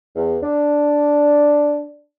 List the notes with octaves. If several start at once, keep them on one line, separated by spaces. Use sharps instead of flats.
E2
D4